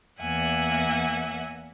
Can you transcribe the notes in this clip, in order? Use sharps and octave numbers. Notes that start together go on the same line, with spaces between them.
E2 A#3 E5 F#5 G#5